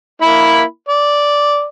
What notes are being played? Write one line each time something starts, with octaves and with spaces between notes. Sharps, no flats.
A#3 E4 B5
D5